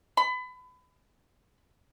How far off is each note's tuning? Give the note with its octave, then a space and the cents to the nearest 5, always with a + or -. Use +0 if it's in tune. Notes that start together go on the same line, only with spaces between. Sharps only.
B5 +30